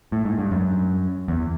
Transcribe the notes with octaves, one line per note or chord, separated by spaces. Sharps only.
A2
G#2
G2
F#2
E2